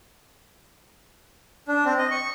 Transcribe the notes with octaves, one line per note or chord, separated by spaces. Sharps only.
D4
C4
D#5
C#6